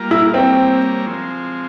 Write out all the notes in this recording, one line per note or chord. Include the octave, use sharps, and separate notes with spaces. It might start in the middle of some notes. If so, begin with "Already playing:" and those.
Already playing: G3 A#3 F4 A#4
E4
G3 A#3 C4 E4 A#4 C#5
F3 G#3 C4